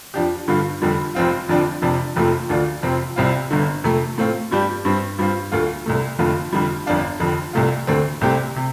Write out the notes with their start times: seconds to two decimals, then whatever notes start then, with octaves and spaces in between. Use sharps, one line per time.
0.14 F2 F3 D4 G4
0.48 G2 D3 G3 F4
0.82 F1 F2 D3 G3
1.15 F1 F2 F3 C4 F4
1.49 F1 F2 D3 F3 D4
1.82 F1 F2 C3 F3 D4
2.16 F1 F2 C3 F3 A3
2.50 D2 D3 F3 D4 F4
2.82 F1 F2 C3 F3 C4
3.16 C2 C3 G3 C4 F4
3.51 G1 G2 D3
3.84 F2 C3 A3
4.18 A2 A3 C4 F4
4.51 G2 G3 D4 G4
4.85 G2 G3 C4
5.18 G2 G3 C4 F4
5.52 D2 D3 A3 F4
5.86 C2 C3 A3
6.19 F1 F2 D3 A3 F4
6.53 F1 F2 D3 G3
6.86 G1 F2 F3 D4 F4
7.20 F1 F2 D3
7.53 C2 C3 A3 F4
7.87 D2 D3 A3 C4
8.21 C2 C3 A3 C4 G4
8.56 C3